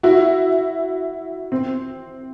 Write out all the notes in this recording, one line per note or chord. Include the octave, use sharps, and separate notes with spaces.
E4 F#4
C4